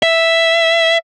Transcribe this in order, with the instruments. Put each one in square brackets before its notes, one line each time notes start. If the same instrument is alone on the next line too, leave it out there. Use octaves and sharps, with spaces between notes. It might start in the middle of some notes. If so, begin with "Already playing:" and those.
[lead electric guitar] E5